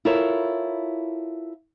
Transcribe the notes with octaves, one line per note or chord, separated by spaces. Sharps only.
E4 F4 A4 A#4 C#5 E5